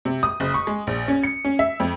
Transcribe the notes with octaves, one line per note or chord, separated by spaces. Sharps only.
C3
D#6
F#1
C#6
G#3
A#1
C#4
C#7
C#4
E5
F2